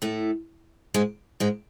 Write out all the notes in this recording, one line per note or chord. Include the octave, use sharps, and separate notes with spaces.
A2 A3
G#2 G#3
G#2 G#3